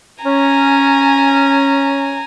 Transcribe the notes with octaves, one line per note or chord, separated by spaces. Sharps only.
C#4 G#5 A#5